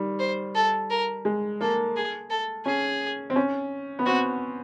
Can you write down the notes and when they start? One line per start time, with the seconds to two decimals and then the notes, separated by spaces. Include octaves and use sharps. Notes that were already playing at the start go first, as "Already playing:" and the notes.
Already playing: D#3 G3
0.19 C5
0.55 A4
0.90 A#4
1.25 G#3
1.61 A#3 A4
1.96 G#4
2.30 A4
2.66 C#4 G#4
3.30 C4
3.36 C#4
3.99 B3
4.06 C4 F#4